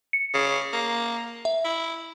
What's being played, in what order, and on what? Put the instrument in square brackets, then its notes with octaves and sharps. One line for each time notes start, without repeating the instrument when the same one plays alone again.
[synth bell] C#7
[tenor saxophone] C#3
A#3
[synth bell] E5
[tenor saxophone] E4